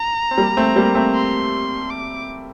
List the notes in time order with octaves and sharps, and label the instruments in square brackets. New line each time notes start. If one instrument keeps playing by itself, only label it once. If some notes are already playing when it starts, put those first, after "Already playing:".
Already playing: [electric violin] A#5
[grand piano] C4
G3 A#3
A3 C4
G3 A#3
A3 C4
[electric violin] C6
D6